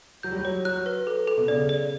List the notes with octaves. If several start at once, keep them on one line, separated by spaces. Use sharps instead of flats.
F#3 G6
G3
F#3
C#5
F#3 F#6
B4
A4
A4
B2
C#3 D5
D5